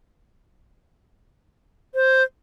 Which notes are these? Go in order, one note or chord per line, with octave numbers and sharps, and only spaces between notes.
C5